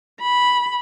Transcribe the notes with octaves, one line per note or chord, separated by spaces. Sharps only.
B5